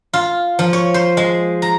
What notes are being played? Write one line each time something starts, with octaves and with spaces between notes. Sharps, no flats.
F4
F3
C#5
C5
G#3
A#5